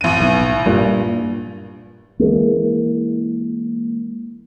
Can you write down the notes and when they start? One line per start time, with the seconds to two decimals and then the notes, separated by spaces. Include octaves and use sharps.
0.01 A1 D#7
0.20 B1
0.66 G2 A#2
2.19 E3 F3 G#3 A#3